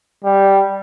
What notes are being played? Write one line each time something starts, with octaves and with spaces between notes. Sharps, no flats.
G3